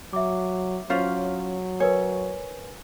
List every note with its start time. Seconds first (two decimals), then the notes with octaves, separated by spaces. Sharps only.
0.13 F#3 E5 D6
0.90 F#3 C#4 F4 C5
1.80 A#4 B4 C#5 G#5